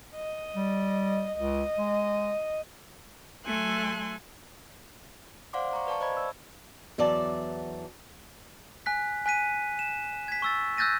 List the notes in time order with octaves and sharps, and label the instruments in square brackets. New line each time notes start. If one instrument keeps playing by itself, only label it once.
[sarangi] D#5
[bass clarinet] G3
[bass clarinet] C#2 [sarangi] D#5
[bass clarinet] G#3
[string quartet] F#3 A3 A4 G#5 C6 F#6
[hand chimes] C5 D5 F5 F#5 C6 D6
A#5 C#6
B4 D5 F5 A5 C#6
C5 D#5 A5 B5 G#6
E6
[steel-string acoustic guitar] E2 E3 F#3 D5 A5
[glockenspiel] G#5 F#6 B6
G#5 F#6 B6 D#7
E7
G#6 B6
C#6 E6 A6
E6 F#6 G6 A6 A#6 D#7